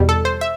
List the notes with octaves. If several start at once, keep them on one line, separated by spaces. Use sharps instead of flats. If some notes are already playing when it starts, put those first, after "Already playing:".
Already playing: E2 B2 G3
A4
C5
E5